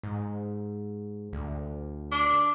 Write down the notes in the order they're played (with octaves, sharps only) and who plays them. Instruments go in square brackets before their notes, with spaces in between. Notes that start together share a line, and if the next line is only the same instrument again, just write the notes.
[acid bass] G#2
D2
[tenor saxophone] D4